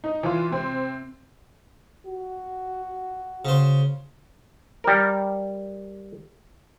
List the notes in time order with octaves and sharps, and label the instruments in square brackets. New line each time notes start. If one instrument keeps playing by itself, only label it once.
[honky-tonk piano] D#4
E3 F4
C3 C4
[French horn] F#4
[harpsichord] C#3 C5
[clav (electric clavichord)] G3 A#4